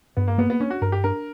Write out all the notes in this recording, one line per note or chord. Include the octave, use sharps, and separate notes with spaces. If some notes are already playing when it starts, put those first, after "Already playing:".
G2 B3
A#3
A#3 B3
B3
C#4 D4
F#4
G2 A#4
G4
D4 A#4